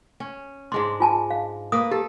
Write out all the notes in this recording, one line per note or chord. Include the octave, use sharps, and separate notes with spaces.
C#4
G#2 G#3 D4 C6
F4 G#5 A5
F5
A#3 B4 D#6
G4 A4